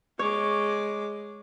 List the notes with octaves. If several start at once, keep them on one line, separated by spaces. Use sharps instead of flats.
G#3 C#5 D6